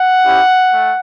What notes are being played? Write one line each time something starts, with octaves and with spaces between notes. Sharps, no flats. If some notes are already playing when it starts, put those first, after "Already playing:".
Already playing: F#5
C#4 E4 G4
A3